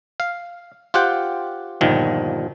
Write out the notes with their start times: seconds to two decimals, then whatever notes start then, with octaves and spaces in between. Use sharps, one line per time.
0.20 F5
0.94 F4 G4 C5 F#5 G5
1.81 G1 D#2 A#2 D#3 F3